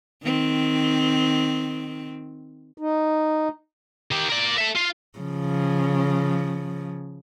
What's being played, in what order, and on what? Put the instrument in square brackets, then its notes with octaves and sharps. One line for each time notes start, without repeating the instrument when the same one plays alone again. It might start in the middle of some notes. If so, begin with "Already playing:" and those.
[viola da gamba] D#3 C4
[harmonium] D#4
[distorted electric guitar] D#3 G4
A#4 D5
A4 E5
F4 F5
[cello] C#3 F3